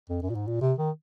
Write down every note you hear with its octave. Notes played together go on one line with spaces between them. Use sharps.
F2
F#2
A#2
G#2
A#2
C3
D#3